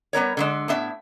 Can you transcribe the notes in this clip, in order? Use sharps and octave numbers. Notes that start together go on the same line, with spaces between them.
G3 B3 A#4 C#5
D3 F3 G#3
A2 B3 E5